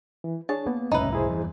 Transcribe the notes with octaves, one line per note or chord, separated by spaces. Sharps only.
E3
D4 G#4 C#5 A5
A#3 B3
F#1 C2 A2 C#4 D#4 B4 E5
E4 G#4 C5
E2 G2 E3